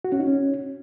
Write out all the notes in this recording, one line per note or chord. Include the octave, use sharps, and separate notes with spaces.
F#4
C#4
D#4
C#4